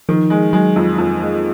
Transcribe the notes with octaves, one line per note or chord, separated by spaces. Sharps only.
D#3 F3
G#3
F#3 G#3
F2
F2
G#3